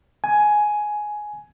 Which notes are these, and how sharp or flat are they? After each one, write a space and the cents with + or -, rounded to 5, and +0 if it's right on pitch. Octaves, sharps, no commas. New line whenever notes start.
G#5 +10